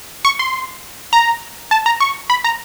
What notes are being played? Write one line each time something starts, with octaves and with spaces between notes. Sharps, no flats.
C#6
C6
A#5
A5
A#5
C#6
B5
A#5